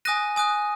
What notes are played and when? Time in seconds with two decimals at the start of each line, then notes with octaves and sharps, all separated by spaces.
0.05 G#5 D#6 F#6 A#6 D#7
0.36 G#5 D#6 F#6